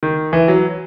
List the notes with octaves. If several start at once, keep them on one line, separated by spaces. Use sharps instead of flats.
D#3
E3
F#3